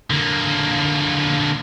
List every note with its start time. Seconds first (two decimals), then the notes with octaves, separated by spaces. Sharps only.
0.10 D3 A#3